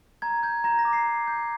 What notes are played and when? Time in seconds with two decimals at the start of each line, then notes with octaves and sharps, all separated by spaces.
0.22 A#5 G#6
0.43 G6 G#6
0.64 A#5 A#6
0.79 A#6
0.85 D6
0.93 C7
1.07 A#5
1.27 G6